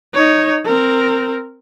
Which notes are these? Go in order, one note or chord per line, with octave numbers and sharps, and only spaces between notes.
D#4 C#5
C4 A#4